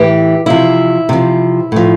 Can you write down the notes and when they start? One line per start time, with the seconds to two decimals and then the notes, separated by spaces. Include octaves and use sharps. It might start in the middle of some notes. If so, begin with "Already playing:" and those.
Already playing: A2 E3 G4
0.46 C3 F3 E4
1.09 C3 F3
1.72 A2 F3